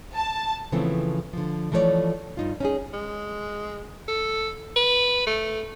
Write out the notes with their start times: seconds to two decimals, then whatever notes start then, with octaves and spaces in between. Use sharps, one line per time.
0.16 A5
0.72 C#3 E3 F3 A3 B3 C4
1.33 D3 F3
1.72 E3 F3 A3 B3 C#5 D5
2.37 G2 D#4 F4
2.60 C#4 D#4 G#4
2.93 G#3
4.08 A4
4.76 B4
5.27 A3